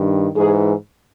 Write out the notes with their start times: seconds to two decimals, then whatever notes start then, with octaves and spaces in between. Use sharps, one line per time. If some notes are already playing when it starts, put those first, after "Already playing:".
Already playing: G2 D#3
0.36 G#2 E3 G#4